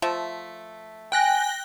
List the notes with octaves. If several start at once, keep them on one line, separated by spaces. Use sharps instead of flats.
F3 A3 E5
G5 G#5 F#6 A#6